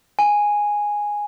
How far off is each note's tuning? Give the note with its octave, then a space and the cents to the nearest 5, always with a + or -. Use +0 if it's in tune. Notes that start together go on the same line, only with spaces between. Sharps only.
G#5 -5